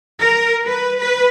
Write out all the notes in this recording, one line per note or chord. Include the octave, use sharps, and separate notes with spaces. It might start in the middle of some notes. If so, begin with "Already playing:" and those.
A#4
B4
B4